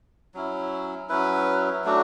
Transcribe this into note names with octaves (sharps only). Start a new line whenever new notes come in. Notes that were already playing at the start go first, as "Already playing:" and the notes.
F#3 C#4 E4
F#3 C#4 E4 B4
F#3 A3 D4 F#4